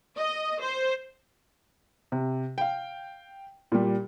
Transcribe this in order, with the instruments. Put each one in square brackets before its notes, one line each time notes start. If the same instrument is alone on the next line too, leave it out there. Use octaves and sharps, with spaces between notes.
[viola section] D#5
C5
[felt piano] C3
F5 G5
A#2 G3